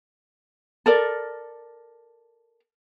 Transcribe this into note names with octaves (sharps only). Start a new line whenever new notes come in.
A4 A#4 D5